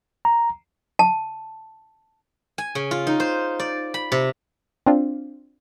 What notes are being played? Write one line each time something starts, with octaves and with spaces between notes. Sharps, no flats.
A#5
A5
G#5
C#3
F4
D#4
C5
D5
B5
C3
C4 D4 F4